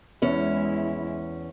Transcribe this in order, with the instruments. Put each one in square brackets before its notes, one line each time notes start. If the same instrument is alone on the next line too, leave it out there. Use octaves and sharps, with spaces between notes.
[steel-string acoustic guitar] E2 C#4 [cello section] G#3 E4